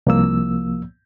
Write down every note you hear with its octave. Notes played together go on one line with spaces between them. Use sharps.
C2 F3 A#3 E6